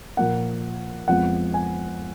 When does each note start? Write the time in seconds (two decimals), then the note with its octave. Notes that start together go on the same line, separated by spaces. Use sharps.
0.17 A#2 F3 A#3 F#5
1.08 F2 F3 G#3 B3 F#5
1.54 G#5